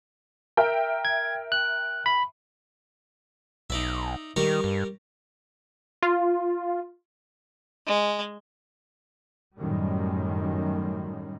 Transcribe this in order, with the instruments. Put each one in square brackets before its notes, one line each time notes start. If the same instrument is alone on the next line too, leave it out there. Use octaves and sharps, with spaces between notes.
[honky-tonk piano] A#4 E5 G5
[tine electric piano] G#6
F#6
B5
[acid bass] B1 [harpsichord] D#4 D5 E5
[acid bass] D#3 [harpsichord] G3 A#4 C#6
[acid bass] G2
[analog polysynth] F4
[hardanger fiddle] G#3
[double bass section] F#2 A2 D#3 G3